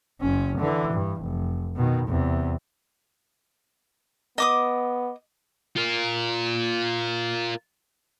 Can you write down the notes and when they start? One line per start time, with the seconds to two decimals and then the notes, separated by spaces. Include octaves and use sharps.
0.21 F#1 C#4
0.59 D3 E3
0.93 G2
1.21 F1
1.76 B2 D#3
2.08 E2 C3
4.38 B3 D#5 D6 D#6
5.77 F4 A#4